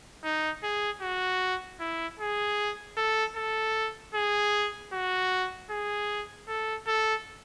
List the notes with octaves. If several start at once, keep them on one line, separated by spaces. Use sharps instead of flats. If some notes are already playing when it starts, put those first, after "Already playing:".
D#4
G#4
F#4
E4
G#4
A4
A4
G#4
F#4
G#4
A4
A4